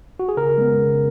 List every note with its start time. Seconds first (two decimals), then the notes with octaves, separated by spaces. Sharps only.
0.20 F#4
0.29 G#4
0.37 C#3 A#4
0.58 G#3 B3
0.78 C#3